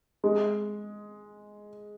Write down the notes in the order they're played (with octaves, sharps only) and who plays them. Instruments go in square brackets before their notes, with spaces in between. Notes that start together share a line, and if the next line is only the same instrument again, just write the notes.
[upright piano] G#3